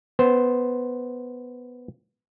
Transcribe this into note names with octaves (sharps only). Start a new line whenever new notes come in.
B3 C5